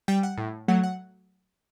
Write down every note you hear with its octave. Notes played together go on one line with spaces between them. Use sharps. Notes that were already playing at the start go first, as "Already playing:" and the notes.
G3 G5
F#5
A2
F#3 A3 F#5
F#5